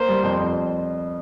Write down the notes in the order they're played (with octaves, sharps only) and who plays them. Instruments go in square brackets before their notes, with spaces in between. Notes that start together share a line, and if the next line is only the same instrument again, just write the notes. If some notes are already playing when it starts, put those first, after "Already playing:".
Already playing: [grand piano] A#3 [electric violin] C5
[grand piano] G3
F2
F2